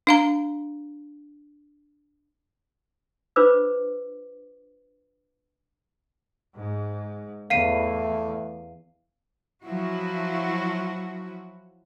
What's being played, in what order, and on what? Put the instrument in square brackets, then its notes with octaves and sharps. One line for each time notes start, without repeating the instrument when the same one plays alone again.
[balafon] D4 F5 A#5
[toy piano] D4 F4 B4 C5 D6 E6
[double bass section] G#2
[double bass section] E2 [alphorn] A3 [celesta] F5 C7 D#7
[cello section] F3 F#3 E4 F#4